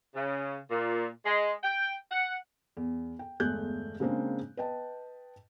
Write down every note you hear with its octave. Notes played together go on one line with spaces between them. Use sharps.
C#3
A#2
G#3
G5
F#5
E2
G5
G1 E2 G#3 A3 F#6 G6
C#3 G#3 A#3 C4 D4
B4 D#5 G5 A5